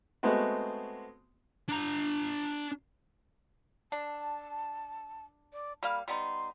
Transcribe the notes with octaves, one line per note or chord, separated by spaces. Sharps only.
G#3 A3 B3 C4 F#4
D4 A#5
D4 A5
D5
G3 A#3 F5 B5
G3 B3 D#4 C6